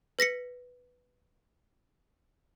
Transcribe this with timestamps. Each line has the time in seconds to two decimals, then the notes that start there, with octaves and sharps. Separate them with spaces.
0.19 B4 A#6 B6 C#7